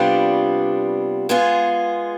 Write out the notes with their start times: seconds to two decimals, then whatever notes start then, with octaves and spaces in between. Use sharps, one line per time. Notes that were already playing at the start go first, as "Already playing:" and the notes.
Already playing: C3 G3 B3 D4 F4
1.29 G#3 B3 F4 G#4